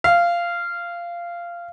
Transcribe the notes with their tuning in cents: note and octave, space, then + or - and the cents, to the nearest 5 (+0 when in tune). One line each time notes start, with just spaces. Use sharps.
F5 -15